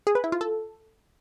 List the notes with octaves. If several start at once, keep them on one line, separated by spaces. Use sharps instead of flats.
G#4
B4
E4
F4
A4